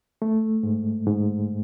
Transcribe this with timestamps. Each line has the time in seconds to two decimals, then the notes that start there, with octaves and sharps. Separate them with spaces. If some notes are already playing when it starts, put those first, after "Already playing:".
0.22 A3
0.63 G#2
1.07 G#2